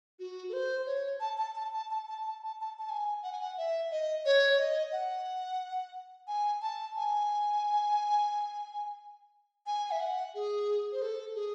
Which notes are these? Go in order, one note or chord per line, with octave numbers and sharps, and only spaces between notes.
F#4
A4
C5
C#5
A5
A5
A5
A5
A5
A5
A5
A5
A5
A5
G#5
F#5
G#5
F#5
E5
D#5
C#5
C#5
D#5
F#5
G#5
A5
G#5
G#5
E5
F#5
G#4
C5
A4
G#4